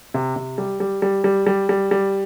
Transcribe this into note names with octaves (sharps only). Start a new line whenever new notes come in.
C3
C3
G3
G3
G3
G3
G3
G3
G3